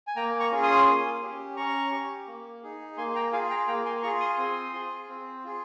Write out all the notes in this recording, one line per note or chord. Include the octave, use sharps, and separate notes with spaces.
G#5
A#3 G5 A#5
A#5 C#6
C#4 F4 G#4
C6 D#6
A#3
C#4 G4
C#4 A#5 C#6
G4
A#3
D#4 G#4
A#3 G#5 C6
G5 A#5
F4 G#4 F5 G#5
G5 A#5
A#3 G5 A#5
G#5 C6
F4 G#4 A#5 C#6
C6 D#6
C4 C6 D#6
F4 G#4
C4
F4 G#4